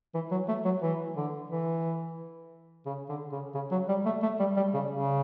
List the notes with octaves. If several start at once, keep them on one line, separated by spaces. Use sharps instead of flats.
E3
F#3
A3
F#3
E3
D3
E3
C#3
D3
C#3
C#3
F#3
G3
A3
A3
G3
G3
C#3
C#3